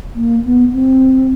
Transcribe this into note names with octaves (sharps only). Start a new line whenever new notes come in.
A#3
B3
C4